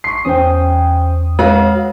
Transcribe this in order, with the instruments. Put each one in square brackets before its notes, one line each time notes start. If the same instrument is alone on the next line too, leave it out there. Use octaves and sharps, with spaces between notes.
[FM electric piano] C6 [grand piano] C#6 C7
[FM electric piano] E2 D#6 [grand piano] C#4 C5 G5
[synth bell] G#3 [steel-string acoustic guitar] F#4 F5 [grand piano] B4